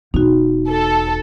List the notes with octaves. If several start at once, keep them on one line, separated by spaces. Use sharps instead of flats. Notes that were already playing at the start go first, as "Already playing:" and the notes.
E1 D#4 F#4
A4